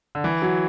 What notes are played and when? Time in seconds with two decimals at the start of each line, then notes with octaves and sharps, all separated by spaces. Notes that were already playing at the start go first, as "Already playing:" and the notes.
0.15 D3
0.24 E3
0.42 F#3